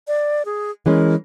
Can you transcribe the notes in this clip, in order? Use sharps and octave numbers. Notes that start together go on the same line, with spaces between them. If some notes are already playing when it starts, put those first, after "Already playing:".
D5
G#4
E3 G#3 C#4 A#4